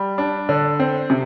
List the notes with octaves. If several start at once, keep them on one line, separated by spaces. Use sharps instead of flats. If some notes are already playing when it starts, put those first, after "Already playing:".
Already playing: G3
D4
D3
C4
C3